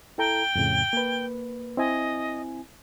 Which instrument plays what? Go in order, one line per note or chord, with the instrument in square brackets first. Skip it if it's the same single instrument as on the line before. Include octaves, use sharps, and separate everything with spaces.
[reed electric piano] E4 A4 A#5 [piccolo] G5
[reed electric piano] F2 A2 C#3
A#3 B4
[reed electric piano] C4 E4 G#5 [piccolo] D#5